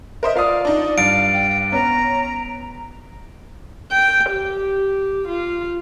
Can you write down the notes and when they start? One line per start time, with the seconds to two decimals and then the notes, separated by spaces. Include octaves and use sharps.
0.23 A#4 C5 D#5 E5
0.35 F4 A#4 D5 F5 D#6
0.65 D4 D#4
0.98 G2 F5 A6 D7
1.34 G5
1.72 B3 C#4 A#5
3.92 G5
4.32 G4
5.28 F4